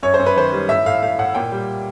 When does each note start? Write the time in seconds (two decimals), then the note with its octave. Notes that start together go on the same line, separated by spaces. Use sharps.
0.03 F#2 C#5
0.14 C5
0.19 F#2
0.26 B4
0.36 D#3 C5
0.52 G3
0.69 A2 E5
0.86 A2 F5
1.02 A2 F5
1.19 A2 F#5
1.35 A#2 G5
1.52 G3